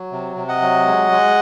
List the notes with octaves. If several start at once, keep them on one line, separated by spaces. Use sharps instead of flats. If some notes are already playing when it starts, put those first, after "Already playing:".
Already playing: F#3
C3
C3
D#5 F#5
F#3
G#3
G#3